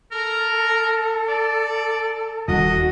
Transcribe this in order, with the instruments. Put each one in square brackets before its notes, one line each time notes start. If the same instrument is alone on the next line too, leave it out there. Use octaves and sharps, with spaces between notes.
[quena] A4 [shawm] A#4
[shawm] D5
[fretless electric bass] D#1 [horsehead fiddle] F#4 [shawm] D#5